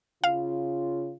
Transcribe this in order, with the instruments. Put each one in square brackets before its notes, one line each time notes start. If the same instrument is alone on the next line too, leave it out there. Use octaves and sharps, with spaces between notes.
[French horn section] C#3 F4 [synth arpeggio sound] F5